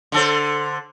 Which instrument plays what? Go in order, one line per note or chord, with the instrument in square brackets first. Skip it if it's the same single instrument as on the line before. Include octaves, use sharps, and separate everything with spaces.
[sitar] D3 A4 C5